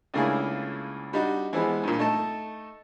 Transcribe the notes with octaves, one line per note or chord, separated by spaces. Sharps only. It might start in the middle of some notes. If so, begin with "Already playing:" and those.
C#2 A3 A#3 D4 E4 G#4
G3 D4 D#4 F#4
E3 F3 G#3 B3
G2 A#2
A3 D#4 A5